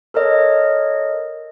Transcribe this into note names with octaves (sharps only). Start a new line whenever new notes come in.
A4 A#4 C#5 D#5